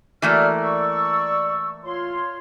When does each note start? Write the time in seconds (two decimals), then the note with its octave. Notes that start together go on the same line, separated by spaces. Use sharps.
0.22 E3 A3 A#3 F#4 D5 F6
0.60 D5 C#6 E6
1.83 F4 C#5 C6